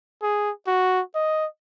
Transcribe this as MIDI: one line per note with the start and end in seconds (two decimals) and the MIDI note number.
0.22 0.51 68
0.67 1.01 66
1.15 1.46 75